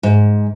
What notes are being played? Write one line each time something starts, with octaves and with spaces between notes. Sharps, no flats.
G#2